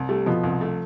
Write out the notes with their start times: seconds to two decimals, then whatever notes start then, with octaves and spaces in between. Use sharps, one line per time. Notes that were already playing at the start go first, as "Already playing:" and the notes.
Already playing: C2
0.09 G3 A3
0.26 B2 F3
0.43 C2
0.61 A3